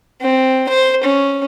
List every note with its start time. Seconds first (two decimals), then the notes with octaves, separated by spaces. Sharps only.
0.21 C4
0.69 C5
1.04 C#4